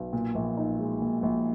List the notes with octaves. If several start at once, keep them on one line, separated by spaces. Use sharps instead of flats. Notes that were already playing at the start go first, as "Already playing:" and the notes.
Already playing: B1
A#2
A#1
D#4
G#3
A#2
A#1